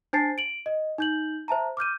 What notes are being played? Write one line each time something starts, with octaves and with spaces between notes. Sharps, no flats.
D4 C5 G#5 A5 A6 C7
D7 F#7
D#5
D#4 G6 F#7
C5 E5 A5 A#5
D6 F6 G6 D#7